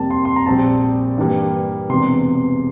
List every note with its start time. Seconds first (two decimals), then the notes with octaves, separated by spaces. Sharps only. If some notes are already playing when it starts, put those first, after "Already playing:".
Already playing: F2 C3 G3 A#3 A5
0.10 C6
0.25 C6
0.36 A#5
0.46 A#1 A#2 G3 C4 A5
1.18 G2 E3 G3 A#3
1.90 E1 E2 C3 C6